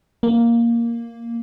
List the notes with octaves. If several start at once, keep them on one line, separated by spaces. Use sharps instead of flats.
A#3